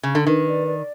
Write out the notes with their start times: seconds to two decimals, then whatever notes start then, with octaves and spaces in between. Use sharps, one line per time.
0.03 C#3
0.15 D3
0.27 D#3 B4
0.47 D5
0.67 D5